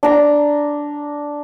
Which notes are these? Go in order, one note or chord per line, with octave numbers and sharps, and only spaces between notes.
D4 A#5